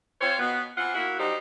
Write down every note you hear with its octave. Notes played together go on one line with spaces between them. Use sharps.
C4 F4 C5 C#5
B2 B3
E3 C4 F4 F#5
A#3 E4 F#4
F#3 G3 D#4 G4 C5